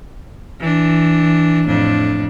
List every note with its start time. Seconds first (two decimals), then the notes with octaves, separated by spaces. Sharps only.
0.60 E3 D4
1.66 F2 A2 D4